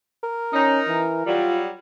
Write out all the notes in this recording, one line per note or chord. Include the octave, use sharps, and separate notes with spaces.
A#4
C#4 D#4
E3
F#3 G3 F4